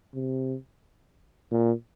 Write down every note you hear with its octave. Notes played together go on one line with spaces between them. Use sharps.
C3
A#2